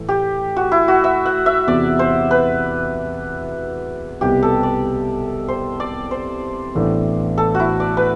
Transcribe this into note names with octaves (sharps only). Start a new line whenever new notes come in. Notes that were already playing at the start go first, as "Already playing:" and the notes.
Already playing: A2 E3 A3
G4
F#4
E4
F#4
E5
F#5
E5
E2 C3 E3 D5
C5
B4
C2 B2 G3 B3 G4
A4
D5
C5
D5
C5
A1 A2 E3 B3 D4
A4
F#4
E4
D5
B4